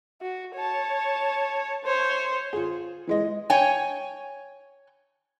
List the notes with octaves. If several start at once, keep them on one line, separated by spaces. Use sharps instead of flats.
F#4
C#5 A5
C5 C#5
F4 G#4
E3 G#3 D#5
C#5 G5 G#5